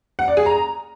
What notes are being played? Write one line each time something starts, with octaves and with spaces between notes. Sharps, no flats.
F#5
D5
G#4
A#5